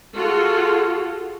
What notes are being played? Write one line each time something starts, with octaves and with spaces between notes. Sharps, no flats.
F4 F#4 G#4 A4